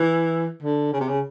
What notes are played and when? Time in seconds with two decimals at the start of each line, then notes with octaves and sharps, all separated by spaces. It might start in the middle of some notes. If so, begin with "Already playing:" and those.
Already playing: E3
0.63 D3
0.93 C#3
1.00 C3
1.08 C#3